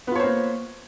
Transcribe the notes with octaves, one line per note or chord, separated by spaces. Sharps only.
A#3 B3 F4 C5 C#5